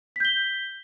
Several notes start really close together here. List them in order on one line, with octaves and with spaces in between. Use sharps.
B6 G6 G7